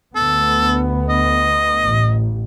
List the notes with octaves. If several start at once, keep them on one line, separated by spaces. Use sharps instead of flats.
D2 B3 A4
D#5
A1